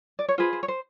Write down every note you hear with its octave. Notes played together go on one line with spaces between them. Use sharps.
D5
C#5
F4 G#4 B4 C5
C5
C#5
C5